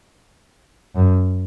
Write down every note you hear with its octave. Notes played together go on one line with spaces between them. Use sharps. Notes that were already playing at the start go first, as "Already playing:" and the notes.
F#2